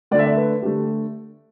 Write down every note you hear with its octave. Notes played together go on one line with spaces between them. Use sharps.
D3 A3 D5
E5
D5
B4
D3 A3 G4